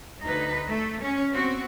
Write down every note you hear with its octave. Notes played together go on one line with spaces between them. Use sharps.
D2 D#4 B4
A3
C#4
B3 C4 F#4